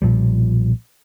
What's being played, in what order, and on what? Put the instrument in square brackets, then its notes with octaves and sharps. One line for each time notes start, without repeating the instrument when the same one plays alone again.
[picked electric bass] B1 A#2 F3 G3